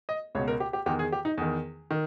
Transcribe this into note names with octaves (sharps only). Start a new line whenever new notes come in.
D#5
C#2 B2 C#5
A#4
G4
G4
E2 D#3 G4
G#4
G4
D#4
E2 D#3
D#3